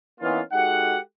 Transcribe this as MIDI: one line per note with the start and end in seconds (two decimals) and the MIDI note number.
0.20 0.40 52
0.20 0.40 58
0.20 0.40 59
0.20 0.40 61
0.20 0.40 63
0.20 0.40 65
0.52 0.97 56
0.52 0.97 63
0.52 0.97 66
0.52 0.97 67
0.52 0.97 69
0.52 0.97 78